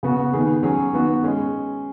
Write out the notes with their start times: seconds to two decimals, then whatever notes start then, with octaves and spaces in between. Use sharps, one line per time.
0.03 C#3 B3 F#4
0.33 D#3 B3 G#4
0.63 F#3 C#4 G#4
0.93 D#3 B3 F#4
1.23 G#3 C#4 G#4